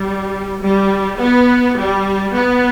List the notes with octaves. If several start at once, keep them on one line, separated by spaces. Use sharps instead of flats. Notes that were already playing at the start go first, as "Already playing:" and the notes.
Already playing: G3
G3
B3
G3
B3